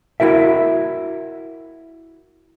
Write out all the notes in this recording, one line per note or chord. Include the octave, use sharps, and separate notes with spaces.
E4 F#4 A#4 E5